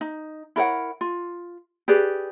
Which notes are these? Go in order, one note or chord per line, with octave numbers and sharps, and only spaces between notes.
D#4
E4 A#4 C#5 F#5
F4
G4 G#4 B4 D5